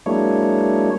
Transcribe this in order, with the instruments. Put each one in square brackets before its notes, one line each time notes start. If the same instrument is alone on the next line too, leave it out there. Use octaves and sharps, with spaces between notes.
[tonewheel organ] F#3 G#3 A#3 D4 E4 C#5